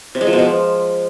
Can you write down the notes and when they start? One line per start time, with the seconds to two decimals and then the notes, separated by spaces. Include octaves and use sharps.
0.15 C3
0.21 G#3
0.27 F3
0.33 B2
0.39 F3